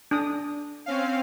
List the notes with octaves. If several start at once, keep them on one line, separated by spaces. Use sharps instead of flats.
D4 D#6
C4 C#4 F5